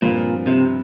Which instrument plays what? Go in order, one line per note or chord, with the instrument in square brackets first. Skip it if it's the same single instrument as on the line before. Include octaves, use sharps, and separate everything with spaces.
[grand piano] G2 F3 C4 F4 [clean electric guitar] A#2
[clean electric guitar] C3